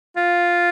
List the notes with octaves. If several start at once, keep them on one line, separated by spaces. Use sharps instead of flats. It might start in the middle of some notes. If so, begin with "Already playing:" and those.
F4